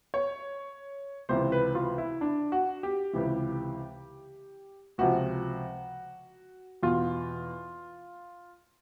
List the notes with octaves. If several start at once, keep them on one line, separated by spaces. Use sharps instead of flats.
C#5
C#2 C3 E3 C5
B4
F4
E4
D4
F#4
G4
C#2 C3 E3
C#2 C3 F3 F#4
E2 B2 F4